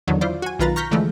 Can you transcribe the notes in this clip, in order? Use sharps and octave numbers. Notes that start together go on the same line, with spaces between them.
E2 D3 D#3 F#3
E4 F4 C5 D5
F#4 G#5
B1 D#3 F4 B4 A#5 A6
A#5 C#6 F6 G6 A#6 B6
D3 E3 F3 G#3 A3